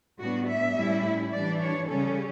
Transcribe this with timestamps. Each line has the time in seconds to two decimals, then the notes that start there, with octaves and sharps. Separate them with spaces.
0.19 A2 G3 B3 D4 F#4
0.47 E5
0.75 A2 G3 C#4 E4
1.32 E3 G3 D4 D5
1.61 C#5
1.88 C#3 G3 C#4 A4